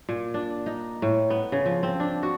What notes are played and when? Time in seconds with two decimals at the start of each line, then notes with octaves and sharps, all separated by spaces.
0.09 A#2
0.34 D4
0.66 D#4
1.02 A2
1.30 B3
1.52 C#3
1.66 F3
1.83 C4
2.00 D4
2.23 F#4